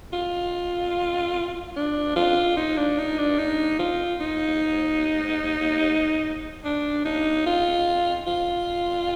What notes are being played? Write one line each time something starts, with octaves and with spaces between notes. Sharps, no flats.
F4
D4
F4
D#4
D4
D#4
D4
D#4
F4
D#4
D4
D#4
F4
F4